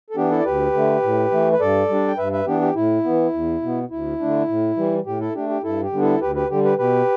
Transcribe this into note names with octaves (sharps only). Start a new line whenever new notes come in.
A4
E3 B3 D4 G4
E4 A4
D5
D2 G4 B4
D3 A3
A2
E3 A3
B4
G2 A4 D5
G3 D4
G5
G2 B4 E5
B4 E5
E3 B3 D4 G4
G4
A2 E4
E3 B3
E2
B2 B3
D2 E4
D3 A3 D4
A2
E3 G3
A2 G4
E4 A4
A3 D4 G4
G4
G2 E4 A4
G4
D3 G3 B3 D4
E4 A4
D2 G4 B4
G4 B4
D3 G3 G4
G4 B4
B2 G4 B4